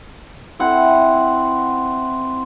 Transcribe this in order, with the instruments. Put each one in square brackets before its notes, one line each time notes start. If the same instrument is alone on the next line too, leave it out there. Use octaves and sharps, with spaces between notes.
[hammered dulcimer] C4 E4 F#5